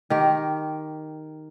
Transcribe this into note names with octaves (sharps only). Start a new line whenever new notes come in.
D#3 G4